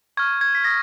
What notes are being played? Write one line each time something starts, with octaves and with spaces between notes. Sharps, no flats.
C#6 F6 G#6
G#6
B6
D#6 A#6